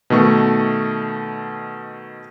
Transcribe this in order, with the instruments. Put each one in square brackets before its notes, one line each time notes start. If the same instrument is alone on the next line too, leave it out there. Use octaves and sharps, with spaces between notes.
[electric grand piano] B2 D#3 A3 C#6